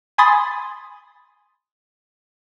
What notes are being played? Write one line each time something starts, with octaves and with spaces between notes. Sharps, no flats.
G#5 B5 C6 D#6 A6